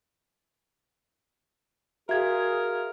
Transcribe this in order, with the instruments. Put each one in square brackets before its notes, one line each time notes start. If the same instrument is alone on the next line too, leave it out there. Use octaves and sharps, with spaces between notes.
[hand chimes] F#4 F5 [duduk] G#4 [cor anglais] A#4 [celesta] E5 G#6